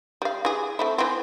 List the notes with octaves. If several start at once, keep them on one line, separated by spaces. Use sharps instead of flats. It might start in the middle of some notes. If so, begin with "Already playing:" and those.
G3 F5
E3 G#4
A3 C4 E4
E3 C4